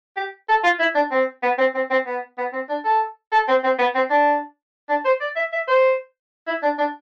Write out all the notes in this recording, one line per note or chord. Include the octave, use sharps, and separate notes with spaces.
G4
A4
F4
E4
D4
C4
B3
C4
C4
C4
B3
B3
C4
D4
A4
A4
C4
C4
B3
C4
D4
D4
C5
D5
E5
E5
C5
E4
D4
D4